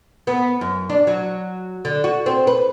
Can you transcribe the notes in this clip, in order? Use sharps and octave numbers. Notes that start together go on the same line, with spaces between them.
B3
F#2
D4
F#3
D3
F#4
C4
B4